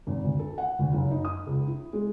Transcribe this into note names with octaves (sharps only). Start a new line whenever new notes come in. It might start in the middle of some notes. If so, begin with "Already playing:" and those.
G#1
D2
A4
F#5
D2
F#1
D#4
D#6
C#2
E4
G#3